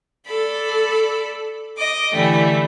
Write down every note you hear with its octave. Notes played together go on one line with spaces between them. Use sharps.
A4 D5 B5
D#5 D6
D3 E3 G3 A3